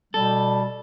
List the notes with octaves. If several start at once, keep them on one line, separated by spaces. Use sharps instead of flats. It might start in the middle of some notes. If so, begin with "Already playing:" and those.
B2 G3 A4